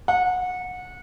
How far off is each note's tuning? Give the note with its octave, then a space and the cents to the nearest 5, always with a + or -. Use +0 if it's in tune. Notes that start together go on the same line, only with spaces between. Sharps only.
F#5 -25